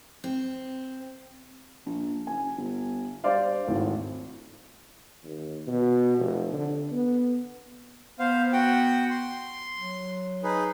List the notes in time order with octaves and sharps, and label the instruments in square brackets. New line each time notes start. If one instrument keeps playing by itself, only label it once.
[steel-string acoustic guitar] C4
[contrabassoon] A#1
[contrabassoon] F#1 [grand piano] G#5
[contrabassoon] G1
[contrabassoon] G2 [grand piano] C5 D5 F5
[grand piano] G#1 [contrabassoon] A2
[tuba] D#2
B2
F1
D3
B3
[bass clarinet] B3 [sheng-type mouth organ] C5 F5
[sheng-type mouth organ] F#4 F#5 G5
C6
[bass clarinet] F#3
[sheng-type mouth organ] D#4 G#4 B4